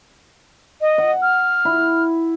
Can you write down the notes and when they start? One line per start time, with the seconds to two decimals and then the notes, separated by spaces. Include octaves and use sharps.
0.81 D#5
0.98 F#5
1.22 F6
1.65 E4